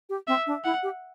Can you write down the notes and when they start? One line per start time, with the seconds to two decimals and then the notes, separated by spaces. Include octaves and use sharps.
0.09 G4
0.28 C4 E5
0.47 D4
0.65 E4 F#5
0.83 G4